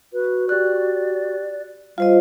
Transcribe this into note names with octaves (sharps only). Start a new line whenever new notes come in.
F#4 B4
G4 D5 F#6
G3 F4 C5 D#5 F5